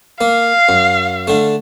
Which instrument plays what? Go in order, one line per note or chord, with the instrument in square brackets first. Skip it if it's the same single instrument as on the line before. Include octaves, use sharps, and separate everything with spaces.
[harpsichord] A#3 [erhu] F5
[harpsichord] F#2
D3 A3